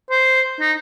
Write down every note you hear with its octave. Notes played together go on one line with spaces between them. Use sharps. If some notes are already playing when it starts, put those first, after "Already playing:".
C5
D#4